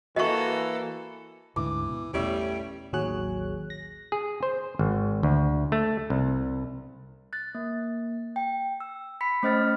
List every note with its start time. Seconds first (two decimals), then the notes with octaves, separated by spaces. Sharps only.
0.16 E3 A#3 F#4 A4 D#5 E5 C#6
1.56 D2 G#2 D3 E3 D6
1.89 B2
2.14 A1 E2 B2 G3 C#5 E5
2.93 A1 D#2 F#3 G#4 C#5 F#6
3.70 A#6
4.12 G#4
4.43 C5
4.79 G#1
5.23 D2
5.72 A3
6.10 C2
7.33 F#6 A6
7.55 A#3
8.36 G5
8.80 E6
9.21 B5 B6 C#7
9.43 A3 C#4 C5 D#5 F6 A6